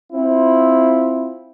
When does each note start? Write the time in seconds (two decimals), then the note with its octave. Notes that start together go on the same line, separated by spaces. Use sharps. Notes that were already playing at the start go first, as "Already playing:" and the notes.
0.13 C4 E4 F4